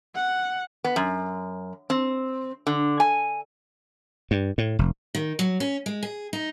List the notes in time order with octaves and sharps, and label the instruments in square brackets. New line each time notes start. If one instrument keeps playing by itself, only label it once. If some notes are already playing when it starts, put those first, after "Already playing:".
[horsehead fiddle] F#5
[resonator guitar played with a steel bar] B3
F#2
C4
D3
G#5
[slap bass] G2
A2
F1
[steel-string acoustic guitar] D#3
F#3
C#4
G#3
G#4
D#4